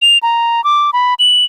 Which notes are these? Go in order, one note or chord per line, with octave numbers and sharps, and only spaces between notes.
F7
A#5
D6
B5
F#7